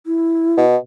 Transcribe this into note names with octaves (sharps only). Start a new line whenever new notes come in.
E4
B2